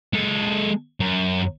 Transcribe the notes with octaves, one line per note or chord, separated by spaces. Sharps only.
G#3 A4
F#2